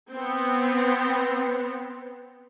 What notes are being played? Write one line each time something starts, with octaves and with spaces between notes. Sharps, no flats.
B3 C4